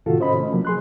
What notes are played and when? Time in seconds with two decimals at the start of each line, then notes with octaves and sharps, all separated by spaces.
0.06 A2 C3 D#3 F4 F#4 A4
0.20 C#4 C5 D#5 B5
0.36 A3 C#4
0.53 C3 F3 F#3 A#3
0.65 G#4 C6 F#6